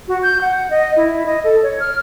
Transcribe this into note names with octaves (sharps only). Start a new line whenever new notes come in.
F#4
G6
F#5
D#5
E4
D#5
A4
C#5
F6